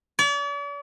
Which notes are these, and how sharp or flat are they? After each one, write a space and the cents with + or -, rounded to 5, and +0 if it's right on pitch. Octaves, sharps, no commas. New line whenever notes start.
D5 -45